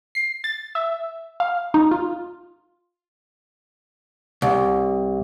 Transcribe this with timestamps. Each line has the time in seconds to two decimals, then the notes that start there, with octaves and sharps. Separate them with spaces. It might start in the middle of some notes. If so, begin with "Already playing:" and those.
0.15 C7
0.44 A6
0.75 E5
1.40 F5
1.74 D#4
1.91 F4
4.42 C2